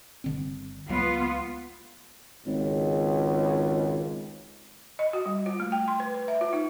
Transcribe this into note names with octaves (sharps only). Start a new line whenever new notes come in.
G1 D3 C4
C#2 F#3 G#3 B3 F4
G#1 C#2
D#5
F#4
G3
F4
A3
G5
C6
B4
B4
E5
F4
D#4